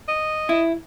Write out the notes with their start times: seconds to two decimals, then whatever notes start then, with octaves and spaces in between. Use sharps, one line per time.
0.08 D#5
0.49 E4